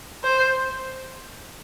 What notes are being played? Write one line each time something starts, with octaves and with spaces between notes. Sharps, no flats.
C5